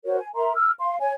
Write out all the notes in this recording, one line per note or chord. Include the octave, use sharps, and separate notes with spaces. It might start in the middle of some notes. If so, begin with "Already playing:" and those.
F#4 A#4 C5 C#5
G#5
A#4 E5 A#5 C6
E6 F6
F5 C6
C#5 G#5